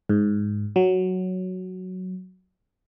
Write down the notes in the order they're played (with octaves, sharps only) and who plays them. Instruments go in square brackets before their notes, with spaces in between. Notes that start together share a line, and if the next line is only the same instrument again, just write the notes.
[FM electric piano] G#2
F#3